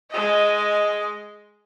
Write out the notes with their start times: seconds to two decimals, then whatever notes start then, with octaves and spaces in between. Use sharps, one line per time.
0.11 G#3 D#5